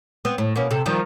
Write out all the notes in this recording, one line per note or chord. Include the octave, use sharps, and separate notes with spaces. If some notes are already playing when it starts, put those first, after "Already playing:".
B3 C4
A2
B2 A#3 C#4
C3 A4
D#3 F3 G3